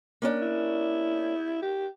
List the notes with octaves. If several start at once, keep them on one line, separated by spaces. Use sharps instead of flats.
A#3 C#4 D4
E4
G4